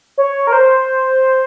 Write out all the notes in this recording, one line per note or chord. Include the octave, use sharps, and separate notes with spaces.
C#5
A#4
C5